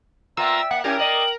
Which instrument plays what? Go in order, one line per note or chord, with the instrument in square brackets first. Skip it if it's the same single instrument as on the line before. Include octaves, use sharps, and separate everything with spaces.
[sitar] A#3 B3 F4 [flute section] D5 E5 G5 [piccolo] A#5 [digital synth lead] E6
[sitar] A#3 [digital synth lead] F#5 [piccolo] C#7
[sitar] C#4 E4 G4 [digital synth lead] A#4 [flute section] G5 [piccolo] G#5
[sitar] A#3 D5 D#5 [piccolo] F#7